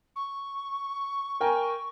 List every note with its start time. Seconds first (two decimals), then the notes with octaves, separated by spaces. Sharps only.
0.16 C#6
1.40 A#4 G5 G#5